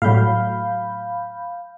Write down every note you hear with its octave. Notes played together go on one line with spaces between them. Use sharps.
A2 F#3 F5 B5 G6